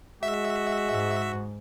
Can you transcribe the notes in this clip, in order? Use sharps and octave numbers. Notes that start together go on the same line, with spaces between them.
G#3 F#4 E5
G#2